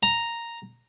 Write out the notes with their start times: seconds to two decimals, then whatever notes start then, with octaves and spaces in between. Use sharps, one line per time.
0.03 A#5